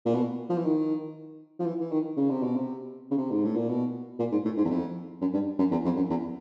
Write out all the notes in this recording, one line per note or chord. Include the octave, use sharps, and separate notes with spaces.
A#2
B2
F3
E3
D#3
F3
E3
E3
D#3
C#3
C3
B2
C3
C#3
C3
G#2
A2
A#2
B2
A#2
G#2
A2
G#2
E2
F2
F#2
G2
F#2
E2
F2
F#2
E2